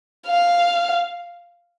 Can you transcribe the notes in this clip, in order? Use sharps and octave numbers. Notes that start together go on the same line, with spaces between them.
F5